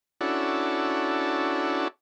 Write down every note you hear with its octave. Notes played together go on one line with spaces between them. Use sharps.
C#4 D4 E4 F#4 A4